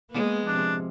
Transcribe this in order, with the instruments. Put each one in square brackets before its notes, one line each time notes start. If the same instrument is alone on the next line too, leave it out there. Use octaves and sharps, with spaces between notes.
[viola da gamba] G#3 B3 [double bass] A#3
[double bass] C3 F3 [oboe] D4